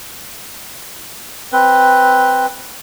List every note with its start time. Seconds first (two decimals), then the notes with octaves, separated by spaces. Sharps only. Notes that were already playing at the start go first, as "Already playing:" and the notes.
1.52 C4 B4